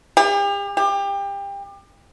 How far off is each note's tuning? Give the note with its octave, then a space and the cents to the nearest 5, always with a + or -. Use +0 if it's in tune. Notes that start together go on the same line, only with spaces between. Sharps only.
G4 +40
G4 +25